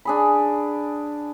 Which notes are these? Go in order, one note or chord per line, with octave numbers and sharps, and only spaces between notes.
D4 G#4 B5